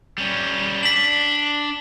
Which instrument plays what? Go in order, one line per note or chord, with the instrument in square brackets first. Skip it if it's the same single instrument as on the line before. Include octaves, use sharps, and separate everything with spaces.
[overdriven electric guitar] G3 C#4
[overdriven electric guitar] D4 [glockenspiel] B6 F#7